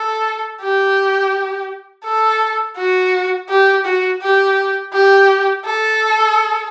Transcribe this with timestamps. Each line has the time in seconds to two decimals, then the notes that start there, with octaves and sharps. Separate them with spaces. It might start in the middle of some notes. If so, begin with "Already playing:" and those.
Already playing: A4
0.61 G4
2.05 A4
2.77 F#4
3.49 G4
3.85 F#4
4.21 G4
4.93 G4
5.65 A4